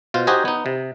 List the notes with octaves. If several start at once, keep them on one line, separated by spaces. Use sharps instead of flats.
B2 F4 C5
D#4 F#4 G4 C5 D#5 G#5
B3 D#4
C3